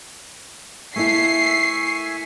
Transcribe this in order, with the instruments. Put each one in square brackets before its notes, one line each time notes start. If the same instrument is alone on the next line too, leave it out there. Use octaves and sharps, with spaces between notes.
[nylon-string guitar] A3 A#3 E4 [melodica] E5 G#5 C#6 [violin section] C7